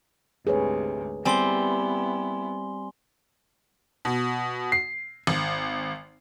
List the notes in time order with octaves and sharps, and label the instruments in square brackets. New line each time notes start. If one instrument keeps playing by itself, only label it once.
[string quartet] D2 G#2 C3 [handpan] G#4 B4 C#5
[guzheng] G3 C4 [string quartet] B3 E4 [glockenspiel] G#5 C6 G7
[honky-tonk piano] B2
C7
G#1